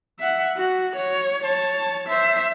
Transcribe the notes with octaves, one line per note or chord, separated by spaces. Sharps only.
E5 F#5
F#4
C#5
C#5 A5
C5 E5